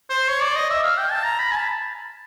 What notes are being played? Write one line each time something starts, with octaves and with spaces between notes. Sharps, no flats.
C5
C#5
D5
D#5
E5
F5
G5
A5
A#5
B5
G#5
A5